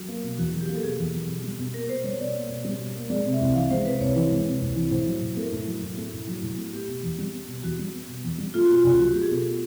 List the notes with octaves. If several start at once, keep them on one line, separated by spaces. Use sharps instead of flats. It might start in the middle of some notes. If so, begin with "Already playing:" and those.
Already playing: F#3
A#3
B2
E2 F#4
F#3
G4
A#3
A4
B2 G#4
E2
F#3
B2
G3
B2
A#3 A#4
B2 C5
G3 C#5
B2 D5
A#3
B2
G3
B2
A#3
G#3 D5
C3
E5
C2
E3 F5
G#3 C5
C3 B4
C2 C#5
E3
G#3
C3
C2
E3
A2 C5
F#3
A2
A3 A#4
A2
F#3
A2
A3
A2
F#3
A2
A3
B3 G4
B2
E2
G3
B3
B2
E2 F#4
G3
B3
B2
E2
G3
A3 F4
F#4
B2
F4
C#2 F#4
F#3 F#4
G4
A3
G#4
B2 A4